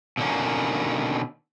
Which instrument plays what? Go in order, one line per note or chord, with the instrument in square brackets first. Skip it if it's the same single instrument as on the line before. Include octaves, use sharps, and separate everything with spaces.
[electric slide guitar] B2 D3 D#3 A3 A#3 C#4